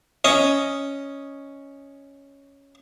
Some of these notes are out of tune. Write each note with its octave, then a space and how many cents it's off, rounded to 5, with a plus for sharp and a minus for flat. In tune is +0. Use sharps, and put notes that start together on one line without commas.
C#4 +0 D#5 +0